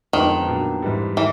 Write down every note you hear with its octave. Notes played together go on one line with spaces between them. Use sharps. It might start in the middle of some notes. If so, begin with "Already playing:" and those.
F2 D3 D#3 F3 G#3 B3
A#2 F#3 B3 D4
G#2 E3 G3
D#3 E3